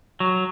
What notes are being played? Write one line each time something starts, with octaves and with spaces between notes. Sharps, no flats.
F#3